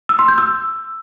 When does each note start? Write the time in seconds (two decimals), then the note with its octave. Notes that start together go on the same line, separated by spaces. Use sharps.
0.09 E6
0.19 C6
0.28 G6
0.38 E6